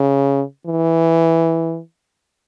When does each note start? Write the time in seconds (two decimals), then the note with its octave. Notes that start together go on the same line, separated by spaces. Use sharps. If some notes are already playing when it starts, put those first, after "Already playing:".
Already playing: C#3
0.67 E3